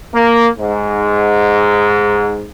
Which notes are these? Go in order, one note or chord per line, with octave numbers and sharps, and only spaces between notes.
A#3
G#2